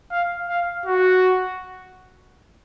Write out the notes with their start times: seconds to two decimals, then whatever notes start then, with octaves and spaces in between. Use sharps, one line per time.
0.11 F5
0.49 F5
0.86 F#4